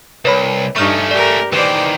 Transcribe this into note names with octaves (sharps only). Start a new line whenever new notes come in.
C2 B4 C#5 B5
G2 A3 C#4 D#4 C#5 C#6 F6
G4 A#4 D5
D#3 E3 B4 C5 D5